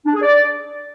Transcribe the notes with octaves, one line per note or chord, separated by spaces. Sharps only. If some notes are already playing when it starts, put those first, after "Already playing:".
D4
G#4
D5